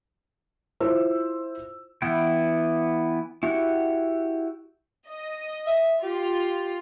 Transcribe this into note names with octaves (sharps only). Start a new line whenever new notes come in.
E4 F4 C5 E6
E3 B3 E4 G5
E4 F#4 G4 F#5
D#5
E5
F4 G4